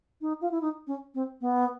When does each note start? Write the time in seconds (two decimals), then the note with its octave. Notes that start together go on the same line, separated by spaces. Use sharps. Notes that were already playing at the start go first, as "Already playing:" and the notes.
0.21 D#4
0.41 F4
0.51 E4
0.62 D#4
0.87 C#4
1.15 C4
1.41 B3